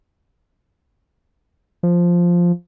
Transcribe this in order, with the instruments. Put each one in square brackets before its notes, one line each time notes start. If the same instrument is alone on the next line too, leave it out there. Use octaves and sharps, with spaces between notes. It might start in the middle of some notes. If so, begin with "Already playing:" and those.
[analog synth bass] F3